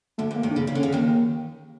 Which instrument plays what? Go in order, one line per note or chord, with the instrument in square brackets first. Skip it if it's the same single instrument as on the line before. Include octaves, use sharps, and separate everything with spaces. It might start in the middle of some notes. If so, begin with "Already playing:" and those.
[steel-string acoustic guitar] D2 D3 [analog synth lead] A3
[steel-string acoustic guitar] D2 D3 [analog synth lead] A#3
[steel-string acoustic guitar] D#2 D#3
[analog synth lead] D4
[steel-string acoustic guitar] C#3
[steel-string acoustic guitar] C#3 [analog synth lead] C#4
[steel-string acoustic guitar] D3
C#3
D#2 D#3